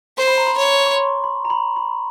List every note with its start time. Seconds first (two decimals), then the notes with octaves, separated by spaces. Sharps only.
0.17 C5 C6
0.28 B5
0.38 A#5
0.47 B5
0.57 C#5
0.86 C#6
0.97 C6
1.24 B5
1.45 A#5
1.50 B5
1.76 B5